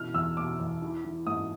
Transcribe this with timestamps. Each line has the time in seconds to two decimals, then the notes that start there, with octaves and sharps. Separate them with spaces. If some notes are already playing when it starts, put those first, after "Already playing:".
Already playing: B2 E3 F6
0.14 E2 E6
0.37 B2 D6
0.60 E2
0.82 E3
1.05 E3
1.26 G#2 D#6